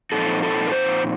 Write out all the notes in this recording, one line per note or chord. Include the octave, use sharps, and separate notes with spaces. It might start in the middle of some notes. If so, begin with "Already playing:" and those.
A#2 F3 C4 D#4 A4
A4
A#4
C5